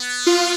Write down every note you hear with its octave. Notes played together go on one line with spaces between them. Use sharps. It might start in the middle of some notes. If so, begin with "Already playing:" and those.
Already playing: B3
F4